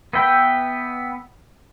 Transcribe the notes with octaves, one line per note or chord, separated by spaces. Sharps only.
B3 B4 E5 G5